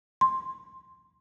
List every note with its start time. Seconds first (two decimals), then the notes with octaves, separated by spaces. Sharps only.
0.21 C6